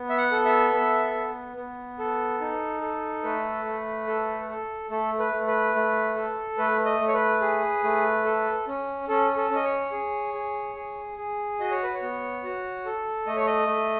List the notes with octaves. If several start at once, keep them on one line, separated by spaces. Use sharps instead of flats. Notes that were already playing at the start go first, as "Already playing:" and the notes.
Already playing: B3
E5
F#5
A4
E5
B3
B3
B3
A4
D#4
A4
A3 B4
A3
A4
A4
A3 A4
B4
A3
B4
A3
A4
A3 B4
D#5
A3
C#5
B4
G#4
A3
A4
C#4
C#4 A4
A4
C#4 D#5
C#5
G#4
G#4
G#4
G#4
F#4 D#5
C#5
B4
C#5
B3
F#4
A4
A3 D#5
C#5
D#5
A3